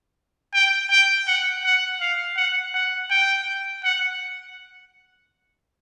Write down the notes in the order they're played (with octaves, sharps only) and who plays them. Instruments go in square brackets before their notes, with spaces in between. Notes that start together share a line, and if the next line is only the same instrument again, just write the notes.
[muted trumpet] G5
G5
F#5
F#5
F5
F#5
F#5
G5
F#5